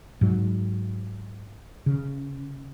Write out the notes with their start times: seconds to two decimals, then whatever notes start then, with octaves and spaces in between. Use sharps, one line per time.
0.21 G#2 F#3
1.86 C#3